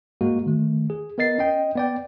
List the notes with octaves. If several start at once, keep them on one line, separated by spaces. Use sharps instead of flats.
G#2 G#3 A#3 F#4
D#3 A3
G#4
B3 A#4 D#5 A6 C7
C#4 D#5 G5
B3 D5 G5